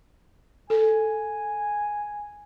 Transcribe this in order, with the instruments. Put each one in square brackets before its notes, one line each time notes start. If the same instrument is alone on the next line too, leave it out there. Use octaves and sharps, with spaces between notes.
[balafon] A4 [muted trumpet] G#5